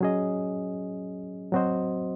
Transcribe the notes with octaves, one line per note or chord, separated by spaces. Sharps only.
F#3 C#4 G#4 D#5
F#3 C4 F#4 C5 D#5